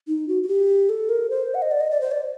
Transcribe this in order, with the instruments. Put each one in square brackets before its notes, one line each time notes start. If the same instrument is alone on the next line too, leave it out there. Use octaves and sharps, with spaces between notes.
[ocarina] D#4
F#4
F#4
G4
A4
A#4
C5
F#5
D#5
D5
D#5
D5
C5
D5